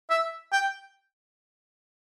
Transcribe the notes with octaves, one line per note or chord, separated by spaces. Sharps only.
E5
G5